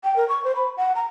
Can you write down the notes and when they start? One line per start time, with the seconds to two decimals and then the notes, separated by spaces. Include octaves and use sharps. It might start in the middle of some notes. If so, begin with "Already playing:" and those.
0.04 G5
0.16 A#4
0.29 C#6
0.44 C5
0.55 B5
0.77 F#5
0.95 A#5